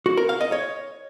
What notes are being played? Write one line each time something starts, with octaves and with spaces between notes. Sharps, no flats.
F#4
A#4
F5
D#5
C#5